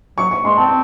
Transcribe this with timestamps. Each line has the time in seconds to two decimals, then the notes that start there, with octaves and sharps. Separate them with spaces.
0.18 F#3 C#6
0.31 C#6
0.44 G#3 C6
0.57 C4 A5